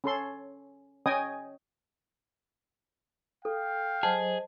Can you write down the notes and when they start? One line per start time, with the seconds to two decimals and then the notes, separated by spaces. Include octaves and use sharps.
0.04 C#4 A4 C6
1.06 C#4 D#5 G5 G#5 D#6
3.45 A4 F5 G5
4.03 F#3 G#4 C5 D#5 A5